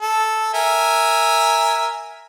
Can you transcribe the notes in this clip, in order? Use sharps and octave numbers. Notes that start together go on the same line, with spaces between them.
A4
A#4 E5 G#5